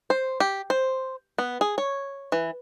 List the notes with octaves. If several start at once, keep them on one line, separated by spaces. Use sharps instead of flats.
C5
G4
C5
B3
G#4
C#5
E3